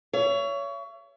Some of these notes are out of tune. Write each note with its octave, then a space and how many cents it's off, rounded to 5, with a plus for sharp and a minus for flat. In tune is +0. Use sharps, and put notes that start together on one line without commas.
C#5 +25 E5 +40